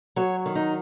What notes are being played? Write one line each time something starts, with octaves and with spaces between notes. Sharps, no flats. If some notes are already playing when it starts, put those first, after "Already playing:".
F#3 C#5
D#3
D#4